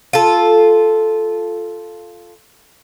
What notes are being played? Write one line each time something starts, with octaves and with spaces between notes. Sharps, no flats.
F4 A4